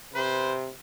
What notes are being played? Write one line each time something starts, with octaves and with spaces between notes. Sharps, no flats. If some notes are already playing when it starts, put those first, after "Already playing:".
C3 B4 C5